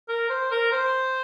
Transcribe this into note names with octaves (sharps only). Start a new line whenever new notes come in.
A#4
C5
A#4
C5